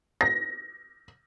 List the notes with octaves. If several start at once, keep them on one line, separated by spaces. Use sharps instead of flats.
A#6